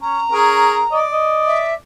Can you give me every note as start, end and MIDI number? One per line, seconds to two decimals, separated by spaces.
0.01 0.20 61
0.01 0.96 82
0.32 0.78 61
0.32 0.81 68
0.32 0.81 70
0.91 1.75 74
0.91 1.04 75
1.12 1.63 75
1.46 1.74 76